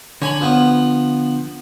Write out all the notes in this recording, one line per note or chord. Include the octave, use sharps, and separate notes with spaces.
D3 C#5 G#5 B5
F3 B3